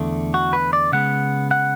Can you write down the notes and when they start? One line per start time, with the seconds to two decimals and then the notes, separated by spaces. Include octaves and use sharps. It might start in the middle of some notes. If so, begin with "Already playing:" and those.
Already playing: E2 D3 A3
0.34 F#4
0.53 B4
0.73 D5
0.92 C#3 G#3 B3 F#5
1.51 F#5